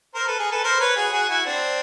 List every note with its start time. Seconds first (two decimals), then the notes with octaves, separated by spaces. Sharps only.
0.14 A#4 C5
0.27 A4 B4
0.39 G#4 A#4
0.52 A4 B4
0.64 A#4 C5
0.80 B4 C#5
0.96 F#4 G#4
1.13 F#4 G#4
1.29 E4 F#4
1.45 C4 D4